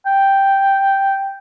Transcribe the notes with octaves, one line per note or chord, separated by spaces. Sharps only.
G5